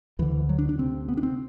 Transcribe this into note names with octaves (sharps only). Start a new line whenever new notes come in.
D2 D3 E3
F#3
D4
D4
D2 C3 C4
B3
D4
C4